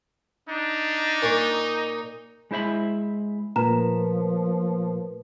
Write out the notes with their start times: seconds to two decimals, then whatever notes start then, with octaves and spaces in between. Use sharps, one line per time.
0.49 D4 D#4
1.22 A#2 C#6
2.51 G#3 E4 C5 E5 B5
3.56 A#2 F3 A3 A#4 B4 A#5